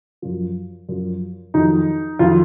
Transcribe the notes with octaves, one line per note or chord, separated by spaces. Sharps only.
F#2 F3
F#2 F3
F2 D#3 F#3 D#4
F2 D#3 F#3 F4